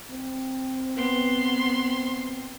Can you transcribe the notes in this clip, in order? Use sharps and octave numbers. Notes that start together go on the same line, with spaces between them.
C4
B3 C6